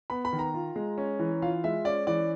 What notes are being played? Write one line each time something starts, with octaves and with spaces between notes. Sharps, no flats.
B3 B5
B5
D#3
A#5
F4
G#3
C#4
E3
F4 F5
G#3 E5
C#4 D5
E3 D5